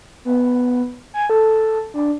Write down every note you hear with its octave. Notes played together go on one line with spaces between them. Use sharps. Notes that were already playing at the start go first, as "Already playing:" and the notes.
B3
G#5
A4
D4